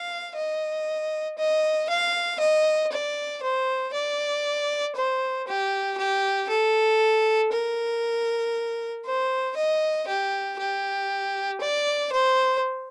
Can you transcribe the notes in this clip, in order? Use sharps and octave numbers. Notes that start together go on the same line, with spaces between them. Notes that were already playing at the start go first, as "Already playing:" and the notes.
Already playing: F5
D#5
D#5
F5
D#5
D5
C5
D5
C5
G4
G4
A4
A#4
C5
D#5
G4
G4
D5
C5